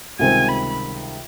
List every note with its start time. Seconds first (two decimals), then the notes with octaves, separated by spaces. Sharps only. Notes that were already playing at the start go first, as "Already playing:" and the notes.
0.19 C#2 C3 D#3 G3 C4 G#5
0.49 B5